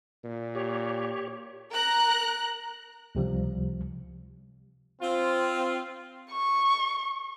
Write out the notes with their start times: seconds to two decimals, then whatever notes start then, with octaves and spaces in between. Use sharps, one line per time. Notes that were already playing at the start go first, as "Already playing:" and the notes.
0.24 A#2
0.55 G4 C#5
1.71 A#4 A#5 F#6
3.15 C#2 C3 F3 G3
5.01 C4 F4
6.32 C#6